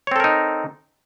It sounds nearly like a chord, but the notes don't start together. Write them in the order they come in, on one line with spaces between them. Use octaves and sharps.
C#5 C4 A4 A#4 D#4